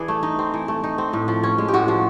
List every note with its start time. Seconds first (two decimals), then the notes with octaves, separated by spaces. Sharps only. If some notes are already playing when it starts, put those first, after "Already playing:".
Already playing: E3 D4 G#4
0.08 A3
0.23 D#4
0.39 C4
0.54 E3
0.68 A3
0.84 D#4
0.98 C4
1.13 A2
1.28 F3
1.44 C#4
1.58 G#3
1.68 G4
1.74 A2 F#4
1.88 F3